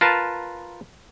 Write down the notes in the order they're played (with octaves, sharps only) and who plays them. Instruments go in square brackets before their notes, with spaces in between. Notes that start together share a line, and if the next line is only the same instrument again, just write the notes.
[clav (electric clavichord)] F4 A#4 B4 A5